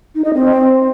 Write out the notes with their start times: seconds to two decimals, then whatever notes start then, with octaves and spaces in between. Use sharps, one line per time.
0.15 D#4
0.24 D#5
0.34 C4